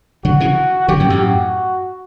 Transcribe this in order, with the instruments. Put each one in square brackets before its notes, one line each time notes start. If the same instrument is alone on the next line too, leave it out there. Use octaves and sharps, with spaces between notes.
[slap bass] D3 F#3 [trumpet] F#4
[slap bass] C#3 E3
[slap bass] D3 F#3 [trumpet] G4
[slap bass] F#2 A2
F#2 A2
[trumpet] F#4